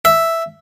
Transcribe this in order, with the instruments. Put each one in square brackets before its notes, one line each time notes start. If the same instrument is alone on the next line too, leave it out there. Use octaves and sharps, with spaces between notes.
[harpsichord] E5